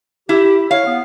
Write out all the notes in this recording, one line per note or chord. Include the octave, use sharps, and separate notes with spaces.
E4 G4
C#5 F5
B3